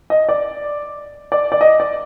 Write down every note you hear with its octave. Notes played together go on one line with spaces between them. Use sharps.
D#5
D5
D5
D5
D#5
D5